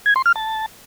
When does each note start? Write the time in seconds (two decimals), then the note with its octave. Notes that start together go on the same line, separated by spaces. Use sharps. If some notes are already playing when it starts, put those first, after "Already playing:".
0.06 G#6
0.16 C6
0.26 F6
0.36 A5